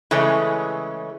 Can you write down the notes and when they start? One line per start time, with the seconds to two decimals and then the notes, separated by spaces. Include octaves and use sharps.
0.11 C#3 E3 G#3 A3 C#4